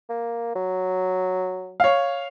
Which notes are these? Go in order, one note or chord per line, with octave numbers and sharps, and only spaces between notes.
A#3
F#3
C#5 F5